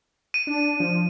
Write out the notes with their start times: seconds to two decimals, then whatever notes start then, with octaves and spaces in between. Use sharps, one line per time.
0.34 D#7
0.47 D4
0.80 F3